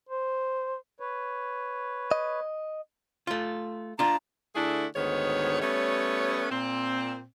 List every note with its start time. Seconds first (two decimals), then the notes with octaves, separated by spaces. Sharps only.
0.09 C5
1.00 B4 C#5
2.11 D#5
3.27 A3 F4
3.99 D4 F4 A#5
4.56 D3 A3 D4 E4 G#4
4.96 D2 G#2 D#3 B3 C#5
5.61 G3 A3 B3 C#4 C#5
6.51 A#2 C4